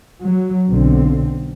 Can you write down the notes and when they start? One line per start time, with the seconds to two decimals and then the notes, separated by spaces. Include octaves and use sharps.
0.22 F#3
0.69 B1 D3 C4